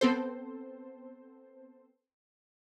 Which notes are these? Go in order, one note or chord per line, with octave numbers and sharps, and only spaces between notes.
B3 C4 A4 C5